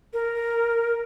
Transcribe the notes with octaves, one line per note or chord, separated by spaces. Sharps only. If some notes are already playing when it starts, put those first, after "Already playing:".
A#4